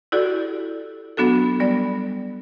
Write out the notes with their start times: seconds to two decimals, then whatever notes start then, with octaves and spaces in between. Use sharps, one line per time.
0.12 E4 F#4 G4 A4 D5
1.17 F#3 B3 D4 F#4 A4
1.60 G3 B3 D5